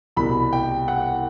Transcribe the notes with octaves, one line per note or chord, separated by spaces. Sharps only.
C2 B2 G3 B5
G5
F#5